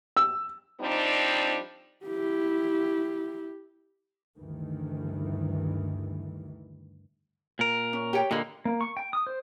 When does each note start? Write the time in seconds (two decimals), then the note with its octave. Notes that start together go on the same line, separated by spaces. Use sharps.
0.17 E6
0.81 F3 G3 C4 D4 D#4
2.06 E4 G4
4.36 D2 G2 D#3 E3
7.59 A#2 A#4
7.93 C#4
8.13 G4 C#5 G5
8.31 A#2 D3 A#3 D#5 B5
8.65 A#3
8.81 C#6
8.97 G5
9.13 D#6
9.27 C5